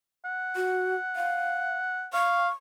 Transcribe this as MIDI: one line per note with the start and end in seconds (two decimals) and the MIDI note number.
0.25 2.06 78
0.56 0.95 66
1.16 1.77 77
2.13 2.49 77
2.13 2.53 85